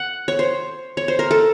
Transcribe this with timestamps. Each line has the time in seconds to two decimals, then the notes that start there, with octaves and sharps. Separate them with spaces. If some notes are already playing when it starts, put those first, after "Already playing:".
Already playing: F#5
0.28 C#5
0.39 C5
0.97 C#5
1.08 C5
1.19 A#4
1.31 A4